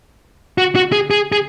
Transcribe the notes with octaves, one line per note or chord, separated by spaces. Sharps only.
F#4
F#4
G#4
G#4
G#4